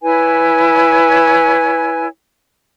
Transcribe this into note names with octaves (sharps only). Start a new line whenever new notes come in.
E4 B4 C#5 G#5